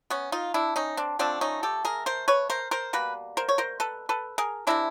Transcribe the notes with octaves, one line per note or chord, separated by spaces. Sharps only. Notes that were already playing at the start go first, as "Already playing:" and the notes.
B3 C#4
D#4 F4
D4 E4
C#4 D#4
C4 D4
D3 F3 A3 C4 D4
C#4 D#4
G4 A4
G#4 A#4
A#4 C5
B4 C#5
A#4 C5
A#4 C5
B2 G3 A#3 B4
A#4 C5
C#5
A#4 C5
A4 B4
A4 B4
G#4 A#4
C3 D#3 G#3 D4 E4